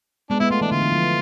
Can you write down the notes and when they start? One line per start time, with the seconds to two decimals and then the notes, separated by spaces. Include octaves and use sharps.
0.30 G#3 B3 D4
0.40 G#3 B3 E4
0.50 A3 F4
0.61 E3 D4
0.71 D3 F4
0.81 E3
0.92 F3